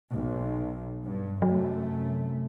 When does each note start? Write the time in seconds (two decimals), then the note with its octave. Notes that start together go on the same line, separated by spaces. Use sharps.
0.11 B1
1.04 G2
1.42 F#2 C3 F#3 A3